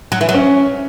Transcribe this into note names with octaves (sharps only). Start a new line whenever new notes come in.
F#3
E3
F#3
C#4